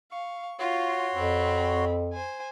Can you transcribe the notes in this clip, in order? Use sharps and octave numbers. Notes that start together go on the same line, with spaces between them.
F5 C#6
F4 F#4 C#5 C6
F2 C4 B5
C5 G#5